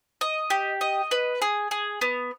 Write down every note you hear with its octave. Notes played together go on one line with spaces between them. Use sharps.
D#5
G4
D#5
B4
G#4
G#4
B3